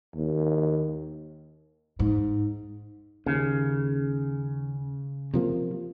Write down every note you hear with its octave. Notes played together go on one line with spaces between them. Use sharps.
D#2
G#2
D#2 C#3
C3 F3 A#3